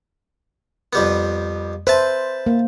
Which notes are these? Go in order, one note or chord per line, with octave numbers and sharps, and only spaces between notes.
F2 G3 B3
B4 C5 E5 A5
A#3